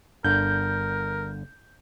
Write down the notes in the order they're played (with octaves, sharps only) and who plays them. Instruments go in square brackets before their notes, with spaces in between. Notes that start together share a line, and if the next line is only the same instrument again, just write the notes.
[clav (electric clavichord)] G1 D3 [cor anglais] A#4 [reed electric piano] G6